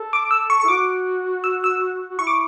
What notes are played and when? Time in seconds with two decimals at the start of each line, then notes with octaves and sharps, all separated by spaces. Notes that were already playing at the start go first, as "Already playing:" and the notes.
Already playing: A4
0.13 D6
0.31 E6
0.50 C#6
0.60 C#6
0.64 E4
0.68 F#4 D6
1.44 E6
1.64 E6
2.10 F#4
2.19 E4 C#6
2.27 D6